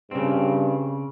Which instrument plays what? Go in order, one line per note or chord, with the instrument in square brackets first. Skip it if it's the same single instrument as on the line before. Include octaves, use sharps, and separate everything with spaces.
[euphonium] G2 [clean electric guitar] C#3 C4